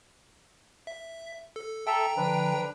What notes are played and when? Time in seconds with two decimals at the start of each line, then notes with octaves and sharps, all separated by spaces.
0.87 E5
1.56 A4
1.87 A4 E5 G5 A#5
2.17 D3 F3 D4 B4